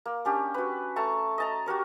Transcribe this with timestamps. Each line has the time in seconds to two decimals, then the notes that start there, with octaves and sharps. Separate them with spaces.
0.05 A#3
0.25 C#4 D4 G4
0.54 F#4 B4
0.96 A3 A5 A#5 C#6
1.38 D#5 A5 A#5
1.66 F#4 G4 A#4 C#5